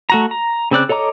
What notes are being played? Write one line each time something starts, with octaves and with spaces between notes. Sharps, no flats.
A3 F#4 A#5
A#5
C#3 C4 D5 F#6
A4 C#5 D#5 A#5 D6